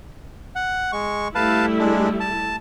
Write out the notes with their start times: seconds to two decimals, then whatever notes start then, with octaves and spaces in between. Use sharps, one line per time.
0.56 F#5
0.93 G#3 C#6
1.35 G3 A3 E4 B4 F5 A5
1.79 G#3 D4
2.20 A5